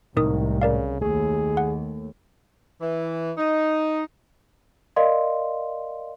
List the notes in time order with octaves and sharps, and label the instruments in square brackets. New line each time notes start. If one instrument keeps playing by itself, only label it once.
[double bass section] C2 [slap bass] A2 C3 G#3 [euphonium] D#3 [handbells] D#4 A#4 D#6
[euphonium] C#3 [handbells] A#4 D5 F5
[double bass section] D#2 [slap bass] A3 [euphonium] G#4
[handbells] F#5
[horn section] E3
D#4
[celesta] A#4 D5 D#5 F5 C6